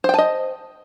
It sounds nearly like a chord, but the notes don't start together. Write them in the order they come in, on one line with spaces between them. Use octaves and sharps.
C5 G5 A5 D#5